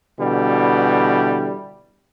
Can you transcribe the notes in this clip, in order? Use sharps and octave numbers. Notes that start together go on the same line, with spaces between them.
B2 D3 E3 G3